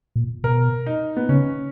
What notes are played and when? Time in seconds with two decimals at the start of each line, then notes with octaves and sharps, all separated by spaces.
0.16 A#2
0.44 B2 A#4
0.86 D#4
1.17 B3
1.29 C#3 C#4